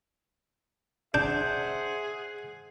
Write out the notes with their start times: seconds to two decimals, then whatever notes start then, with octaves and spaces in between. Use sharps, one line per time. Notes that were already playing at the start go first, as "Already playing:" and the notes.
1.14 D4 G#4 C5 E5 F#5 G6